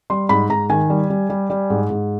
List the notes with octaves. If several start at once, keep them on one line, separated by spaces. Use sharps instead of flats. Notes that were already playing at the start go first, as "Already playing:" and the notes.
G3 C6
G#2 B5
G#2 A#5
D#3 G#5
G3
G3
G3
G3
G#2
G#2